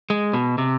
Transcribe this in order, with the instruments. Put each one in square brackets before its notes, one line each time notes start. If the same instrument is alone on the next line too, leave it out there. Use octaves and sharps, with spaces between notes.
[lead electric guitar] G#3
B2
C3